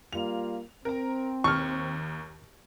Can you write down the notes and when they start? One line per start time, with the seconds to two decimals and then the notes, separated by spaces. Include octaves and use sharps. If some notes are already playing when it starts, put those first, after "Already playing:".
0.13 G3 A#3 F4 F7
0.85 C4 A#4 A#5
1.44 D#2 C#6 F6